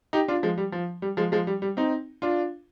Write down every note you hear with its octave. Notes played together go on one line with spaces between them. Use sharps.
D#4 G4
D4 F4
F3 G#3
G3
F3
G3
F3 G#3
F3 G#3
G3
G3
C4 D#4
D4 F4